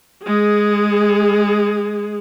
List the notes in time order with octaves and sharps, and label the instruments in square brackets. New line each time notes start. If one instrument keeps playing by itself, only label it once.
[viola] G#3 G#4